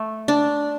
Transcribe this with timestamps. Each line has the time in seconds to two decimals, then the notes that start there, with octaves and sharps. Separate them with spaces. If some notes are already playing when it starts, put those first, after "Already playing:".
Already playing: A3
0.28 D4